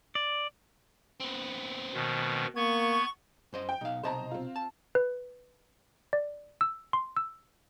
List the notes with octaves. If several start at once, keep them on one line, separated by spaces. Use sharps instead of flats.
D5
B3 C4
B2 D#3
A#3 B3 C#6 G#6
F#2 C5 D#5
G5
B1 D#4 F5
B1 C3 C5 D#5 A5 A#5
C4 F4
A5
B4
D5
E6
C6
E6